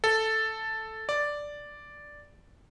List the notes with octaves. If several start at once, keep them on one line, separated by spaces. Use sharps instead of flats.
A4
D5